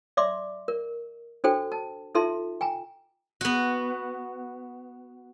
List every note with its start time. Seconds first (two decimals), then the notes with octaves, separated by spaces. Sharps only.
0.17 D5 E5 C6 D6
0.68 A#4
1.44 D4 F#4 A4 C5 G5
1.72 A5
2.15 D#4 F4 A4 E5 A5 C6
2.61 G5 G#5 A#5
3.41 B3 F#4